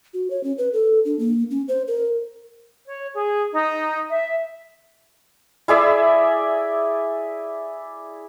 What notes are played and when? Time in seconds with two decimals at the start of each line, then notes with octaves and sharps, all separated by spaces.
0.14 F#4
0.30 C#5
0.44 C#4
0.58 B4
0.73 A4
1.05 D4
1.19 A#3
1.51 C#4
1.68 C5
1.88 A#4
2.86 C#5
3.14 G#4
3.53 D#4
4.09 E5
5.68 E4 G#4 D5 E5